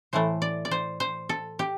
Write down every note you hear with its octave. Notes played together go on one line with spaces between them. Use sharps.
A2 E3 A3 C5
D5
D5
C5
C5
A4
G4